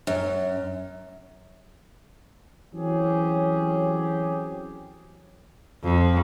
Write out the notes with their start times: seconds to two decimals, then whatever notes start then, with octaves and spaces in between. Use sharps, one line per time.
0.07 F#2
2.74 E3 F#3 C4 C#4 G4 G#4
5.83 F2